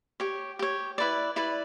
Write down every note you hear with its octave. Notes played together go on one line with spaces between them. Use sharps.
G4 C#5
G4 C#5
E4 B4 D5
E4 B4 D5